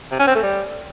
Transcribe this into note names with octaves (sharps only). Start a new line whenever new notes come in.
C3
C#4
C4
A3
G3